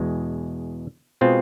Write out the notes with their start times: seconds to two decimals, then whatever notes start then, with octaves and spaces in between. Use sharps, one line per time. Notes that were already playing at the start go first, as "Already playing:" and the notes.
Already playing: E2 B2 G#3
1.21 B2 G#3 C4 F4